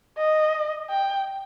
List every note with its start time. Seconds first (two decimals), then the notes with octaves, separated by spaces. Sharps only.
0.18 D#5
0.90 G5